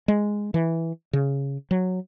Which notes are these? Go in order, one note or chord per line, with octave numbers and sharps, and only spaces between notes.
G#3
E3
C#3
F#3